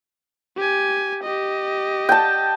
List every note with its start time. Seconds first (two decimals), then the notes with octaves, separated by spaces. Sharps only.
0.57 G4 G#5
1.23 G4 D#5
2.09 G5 A5